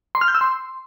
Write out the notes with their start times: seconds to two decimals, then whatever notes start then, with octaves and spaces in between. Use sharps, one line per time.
0.15 C6
0.21 F6
0.28 G6
0.34 E6
0.41 C6